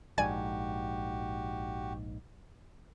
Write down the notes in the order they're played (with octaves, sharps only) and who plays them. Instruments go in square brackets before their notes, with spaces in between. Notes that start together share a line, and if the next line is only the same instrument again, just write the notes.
[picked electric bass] A#1 G#2 [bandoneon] F#4 G4 [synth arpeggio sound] D5 G#5 G#6